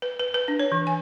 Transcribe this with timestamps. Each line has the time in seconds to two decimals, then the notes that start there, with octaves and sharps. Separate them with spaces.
0.02 B4
0.19 B4
0.34 B4
0.48 D4
0.60 C#5
0.72 E3
0.87 G#5